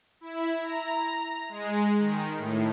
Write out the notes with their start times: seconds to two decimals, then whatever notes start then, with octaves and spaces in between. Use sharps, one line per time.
0.21 E4
0.62 A#5
1.49 G#3
1.98 D#3
2.38 A2